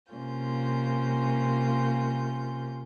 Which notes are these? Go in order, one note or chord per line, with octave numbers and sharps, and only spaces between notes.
C3 A#3 C#4 F4 G6